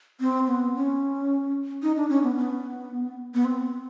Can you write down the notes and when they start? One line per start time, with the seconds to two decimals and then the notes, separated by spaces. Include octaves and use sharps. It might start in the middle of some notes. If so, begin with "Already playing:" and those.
0.20 C4
0.47 B3
0.75 C#4
1.83 D#4
1.96 D4
2.10 C#4
2.23 B3
2.36 B3
3.34 B3
3.45 C4